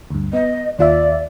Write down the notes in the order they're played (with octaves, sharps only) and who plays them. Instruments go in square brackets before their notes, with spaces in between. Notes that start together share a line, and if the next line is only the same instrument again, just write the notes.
[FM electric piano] D2 G2
[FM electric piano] B3 [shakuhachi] D#5
[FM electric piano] D#2 F4 E5 [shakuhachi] D5